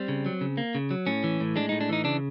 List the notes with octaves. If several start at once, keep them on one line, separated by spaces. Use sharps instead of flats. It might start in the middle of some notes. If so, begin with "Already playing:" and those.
Already playing: G3 C4
C#3
F#3
C#3
A#3
C#3
F#3
A2 C#4
E3
A2
G#3 D4
A2 D#4
D4
E3 D#4
C#3 D4